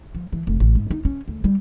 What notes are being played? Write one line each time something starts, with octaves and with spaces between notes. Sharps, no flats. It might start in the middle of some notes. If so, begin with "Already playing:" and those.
F3
E3
F1
A1
G#2
D#4
C#4
D2
G3